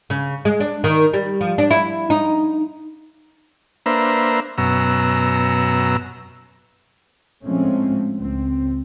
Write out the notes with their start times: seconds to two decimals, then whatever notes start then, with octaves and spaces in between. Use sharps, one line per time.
0.10 C#3
0.45 G#3
0.60 D4
0.84 D#3
1.14 G3
1.41 F3
1.58 D4
1.71 E4
2.10 D#4
3.86 A#3 D4 B4 C5 E5 A#5
4.58 F#2 B2 A#5 E6
7.44 A2 F3 G#3 A3 C4 C#4
8.18 C#2 C4